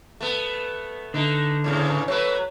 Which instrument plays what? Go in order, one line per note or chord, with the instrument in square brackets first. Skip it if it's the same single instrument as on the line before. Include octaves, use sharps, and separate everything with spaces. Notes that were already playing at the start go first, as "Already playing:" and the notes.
[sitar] A3 B3
[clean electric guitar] D3 [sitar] A3 D#4
[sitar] E2 G#2 C#3
[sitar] F#3 A3 B4 [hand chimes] C#5